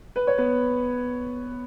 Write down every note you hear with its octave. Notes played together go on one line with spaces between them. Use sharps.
B4
C#5
B3 B4